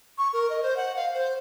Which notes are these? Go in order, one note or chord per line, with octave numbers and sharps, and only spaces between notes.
C#6
A#4
D#5
C5
F#5
F5
C5